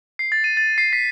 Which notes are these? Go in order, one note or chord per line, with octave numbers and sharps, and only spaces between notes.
C7
A6
D#7
A6
C7
B6